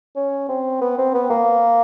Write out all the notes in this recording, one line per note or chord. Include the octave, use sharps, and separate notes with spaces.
C#4
C4
B3
C4
B3
A#3